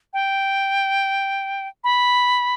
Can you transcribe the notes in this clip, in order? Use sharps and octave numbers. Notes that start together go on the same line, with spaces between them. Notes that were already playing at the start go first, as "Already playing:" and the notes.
G5
B5